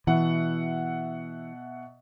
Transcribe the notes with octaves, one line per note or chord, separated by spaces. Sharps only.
B2 E3 E5 F#5